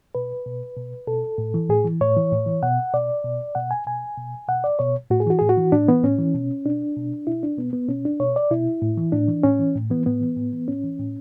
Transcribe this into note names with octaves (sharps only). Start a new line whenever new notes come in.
B2 B4
B2
B2
B2 A4
A2
E3
A2 G#4
E3
A2 C#5
E3
A2
E3
B2 F#5
B2 D5
B2
B2 F#5
G#5
B2 G#5
B2
B2 F#5
D5
B2 C#5
A2 F#4
G#4
E3 F#4
A2 G#4
F#4
E3
A2 D4
E3 B3
A2 C#4
E3
B2
B2 D4
B2
B2 E4
D4
B2 B3
B3
B2 C#4
D4
B2 C#5
D5
B2 E4
A2
E3
A2 D4
E3
A2 C#4
E3
A2
E3 B3
A2 B3
E3
A2
E3
A2 C#4
E3
A2